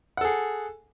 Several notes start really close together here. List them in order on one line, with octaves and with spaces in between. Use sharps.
F#5 A4 G#4